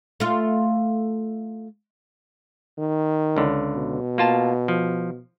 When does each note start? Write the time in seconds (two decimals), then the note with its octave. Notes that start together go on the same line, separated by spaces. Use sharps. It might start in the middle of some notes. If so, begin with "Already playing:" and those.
0.20 A3 F4
2.78 D#3
3.36 C#2 D3
3.75 B2
4.18 A#3 F4 A5
4.68 F3